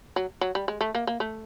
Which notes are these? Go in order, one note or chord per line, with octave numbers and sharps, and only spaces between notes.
F#3
F#3
G3
G#3
A3
A#3
A#3
A3